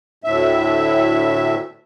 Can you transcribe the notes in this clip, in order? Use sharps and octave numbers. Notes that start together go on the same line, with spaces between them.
D2 A2 E5